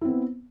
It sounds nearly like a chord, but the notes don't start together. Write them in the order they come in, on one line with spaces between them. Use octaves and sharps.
E4 C4 B3